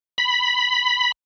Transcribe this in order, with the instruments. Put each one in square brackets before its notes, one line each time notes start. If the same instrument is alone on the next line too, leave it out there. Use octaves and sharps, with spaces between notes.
[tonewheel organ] B5